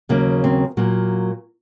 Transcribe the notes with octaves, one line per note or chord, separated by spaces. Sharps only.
D#2 C#3 F#3 A#3
C4
A#2 F#3 A#3